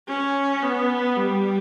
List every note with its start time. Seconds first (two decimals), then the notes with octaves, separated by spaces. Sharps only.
0.08 C#4
0.63 B3
1.16 G3